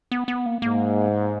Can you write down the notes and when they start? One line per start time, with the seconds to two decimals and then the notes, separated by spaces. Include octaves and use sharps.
0.12 B3
0.28 B3
0.46 A#3
0.62 G#2 A#3